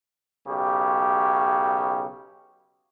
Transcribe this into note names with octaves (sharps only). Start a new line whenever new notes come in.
B1 C#3 G4